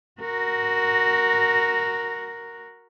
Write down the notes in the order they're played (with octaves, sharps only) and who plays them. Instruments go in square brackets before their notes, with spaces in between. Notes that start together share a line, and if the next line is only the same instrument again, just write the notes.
[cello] F#4 A#4